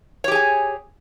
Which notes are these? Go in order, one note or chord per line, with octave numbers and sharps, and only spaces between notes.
G4 G#4 C#5 G#5